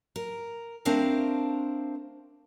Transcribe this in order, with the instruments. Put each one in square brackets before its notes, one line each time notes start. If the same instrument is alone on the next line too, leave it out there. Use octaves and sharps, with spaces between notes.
[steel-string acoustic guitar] A#4
A3 C4 D4 A#4 C5 F5